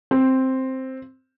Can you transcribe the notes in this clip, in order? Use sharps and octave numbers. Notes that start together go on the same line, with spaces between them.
C4